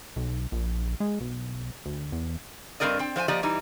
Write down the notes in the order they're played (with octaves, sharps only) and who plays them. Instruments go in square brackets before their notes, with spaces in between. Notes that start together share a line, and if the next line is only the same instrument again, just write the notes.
[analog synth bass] B1
A#1
G#3
B1
D2
E2
[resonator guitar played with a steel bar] G2 C#3 C4 A#4 D5 D#5
C4 G5
F3 C5 F#5 G#5
F3 A#3 G4 D5 D#5
E3 G3 D#4